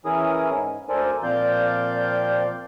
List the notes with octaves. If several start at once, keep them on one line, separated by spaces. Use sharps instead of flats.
E3 C#4 E4 G#4 A#4 D#6
G#2
D2 A4 A#4 C5 D5 G#5
A#2 F3 C4 D5 F5 G6